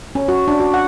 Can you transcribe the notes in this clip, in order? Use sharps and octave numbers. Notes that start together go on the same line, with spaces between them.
C#4
F#4
D4
F#4
F#5